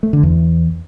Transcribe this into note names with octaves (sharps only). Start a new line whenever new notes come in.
A3
D3
E2